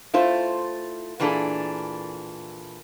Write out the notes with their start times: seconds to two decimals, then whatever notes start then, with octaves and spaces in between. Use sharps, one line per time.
0.14 A3 E4 F4 C5
1.20 A#2 E3 G3 D4 G#4 A4